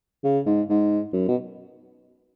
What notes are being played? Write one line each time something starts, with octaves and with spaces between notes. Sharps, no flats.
C#3
G#2
G#2
F#2
B2